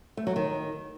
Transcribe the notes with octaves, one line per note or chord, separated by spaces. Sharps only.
A3
F#3
D#3